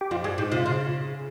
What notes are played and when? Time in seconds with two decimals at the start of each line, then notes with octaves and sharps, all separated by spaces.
0.01 G4
0.11 F2 F4
0.24 G2 G#4
0.38 G#2 G4
0.52 C3 F4
0.66 C#3